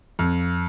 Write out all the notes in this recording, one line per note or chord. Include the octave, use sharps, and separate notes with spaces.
F2